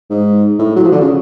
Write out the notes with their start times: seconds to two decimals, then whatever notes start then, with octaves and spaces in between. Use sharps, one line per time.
0.10 G#2
0.59 A2
0.76 F#3
0.84 F3
0.92 D3
1.01 C#3